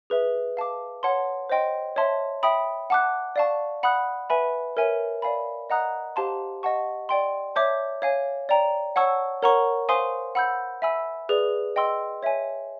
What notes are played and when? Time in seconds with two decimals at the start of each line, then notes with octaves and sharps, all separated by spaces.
0.10 G#4 B4 E5
0.57 F5 A5 D6
1.03 C#5 F#5 A5 C6
1.49 C5 D#5 G5 C6
1.96 C#5 E5 A5 C6
2.43 E5 G5 B5 D#6
2.90 F#5 A5 D6 F#6
3.36 D5 F5 A5 C#6
3.83 F#5 B5 D#6 F#6
4.30 B4 E5 G#5 B5
4.77 A#4 C#5 E5 G#5
5.22 D5 F5 G#5 B5
5.70 D#5 F#5 A#5 D#6 F#6
6.16 G4 C5 F5 A5 C6
6.63 D#5 F#5 A5 C#6
7.09 D5 G5 C6
7.55 C#5 E5 A5 D6 G6
8.02 C#5 F5 G#5
8.49 D5 G5 A#5
8.96 C#5 F#5 A5 C#6 E6
9.42 A#4 C#5 F#5 A#5 C#6
9.89 C5 F5 G#5 C6 D#6
10.35 F#5 B5 E6 G6
10.82 E5 G#5 B5 E6
11.29 G#4 B4 D5
11.76 D#5 G5 C6 E6
12.23 C#5 E5 G#5